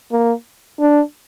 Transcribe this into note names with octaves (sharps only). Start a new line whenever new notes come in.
A#3
D4